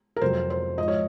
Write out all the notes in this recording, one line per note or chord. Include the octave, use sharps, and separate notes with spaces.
A#4
F2 C3 F#3 C5
C5
G#2 F3 D#5
C#5